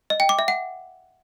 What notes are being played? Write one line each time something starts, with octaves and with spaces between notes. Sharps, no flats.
D#5
G5
D6
E5
F#5